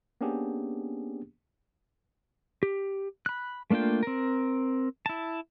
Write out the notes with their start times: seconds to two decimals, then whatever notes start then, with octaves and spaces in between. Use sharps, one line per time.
0.21 A#3 B3 C#4 D4 G4 G#4
2.63 G4
3.26 B5 F#6
3.70 A3 A#3 D4 F4 G5
4.03 C4 A#4
5.06 E4 A5